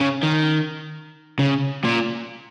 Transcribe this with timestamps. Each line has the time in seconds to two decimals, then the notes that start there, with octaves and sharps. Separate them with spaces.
0.01 C#3
0.23 D#3
1.39 C#3
1.85 A#2